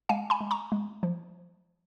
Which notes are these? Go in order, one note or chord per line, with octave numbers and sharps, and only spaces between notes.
G#3 F5 G#5
G#5 B5
G#3
A#5 C#6
G#3
F3